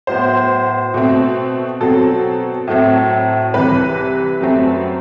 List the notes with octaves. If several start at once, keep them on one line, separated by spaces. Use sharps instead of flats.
A2 F#3 B3 C5
B2 A3 C4
B2 F#3 C4 A4
A2 F#3 A3 C4
C2 C3 E3 B4
F#2 F#3 A3 C4